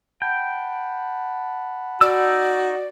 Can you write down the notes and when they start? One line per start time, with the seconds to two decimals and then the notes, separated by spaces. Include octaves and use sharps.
0.22 F#5 G5 A5 B5
2.01 D#4 F#4 D5 E6